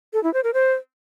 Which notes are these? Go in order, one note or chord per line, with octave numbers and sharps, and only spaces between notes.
A4
E4
C5
A#4
C5